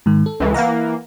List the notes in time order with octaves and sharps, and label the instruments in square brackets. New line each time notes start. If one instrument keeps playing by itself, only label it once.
[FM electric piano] G#2 D#3
A4
[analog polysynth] C#2 E3
[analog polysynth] E3 A#3 [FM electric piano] F5 F#5 A#5